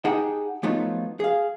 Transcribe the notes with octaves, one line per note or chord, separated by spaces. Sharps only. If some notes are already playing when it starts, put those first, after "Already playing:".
D#4 G4 G#4 F#5 G5 A5
F3 F#3 A3 B3 D#4 F4
G#4 F5